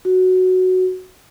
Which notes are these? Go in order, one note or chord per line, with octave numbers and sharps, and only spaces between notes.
F#4